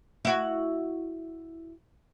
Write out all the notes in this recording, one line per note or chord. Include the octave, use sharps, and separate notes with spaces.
E4 F#4